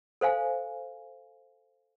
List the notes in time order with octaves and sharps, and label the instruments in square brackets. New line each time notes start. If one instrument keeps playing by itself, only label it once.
[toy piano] A4 C5 F5 G#5